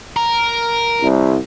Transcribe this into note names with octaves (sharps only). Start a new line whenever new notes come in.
A#4
C2